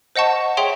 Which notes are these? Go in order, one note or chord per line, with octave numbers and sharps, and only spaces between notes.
C5 D#5 F#5 A5 C#6
G#4 C#5 E5 G5 C6